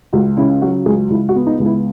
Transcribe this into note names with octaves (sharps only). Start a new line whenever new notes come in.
C#2 F#4
C#3 E4
F#3 F#4
C#2 G#4
C#2 E4
F#4
B3
D#4
C#2
E4